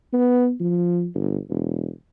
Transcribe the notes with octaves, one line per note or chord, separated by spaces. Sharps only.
B3
F3
G1
E1